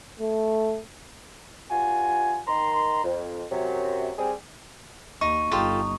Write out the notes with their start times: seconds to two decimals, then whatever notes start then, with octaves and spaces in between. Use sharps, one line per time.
0.19 A3
1.71 G2 F4 F#4 G#5
2.47 D#3 A#5 C6
3.03 F2
3.52 F#2 C3 F#3
4.18 G3 C4 G#4
5.21 D#2 D#4 C#6
5.51 G1 D#4 F4 G4 A4